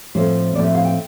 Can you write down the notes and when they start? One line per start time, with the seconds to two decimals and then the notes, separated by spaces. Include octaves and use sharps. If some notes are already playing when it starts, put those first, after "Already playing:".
0.15 A2 F3 A3 C4 C5
0.55 A2 F3 A3 C4 D5
0.64 E5
0.75 F5
0.85 G5